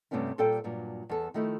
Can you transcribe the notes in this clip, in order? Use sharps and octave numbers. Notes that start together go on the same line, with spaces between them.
G2 C3 A3 B3 C#4 E4
A#2 G3 A4 C5 D5 G5
G2 A#2 F#3 D4
E2 A4
D#3 F3 A3 D#4 E4